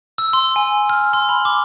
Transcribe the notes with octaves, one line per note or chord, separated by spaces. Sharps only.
E6
C6
G#5
F6
C6
B5
D6